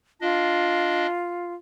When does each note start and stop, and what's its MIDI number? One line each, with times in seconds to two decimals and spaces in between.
0.21 1.07 62
0.21 1.54 65
0.21 1.07 75